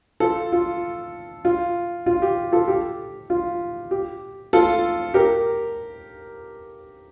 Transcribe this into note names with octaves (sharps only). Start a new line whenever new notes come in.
F4 A4
F4
F4
F4
G4
F4 A4
G4
F4
G4
F4 A4
G4 A#4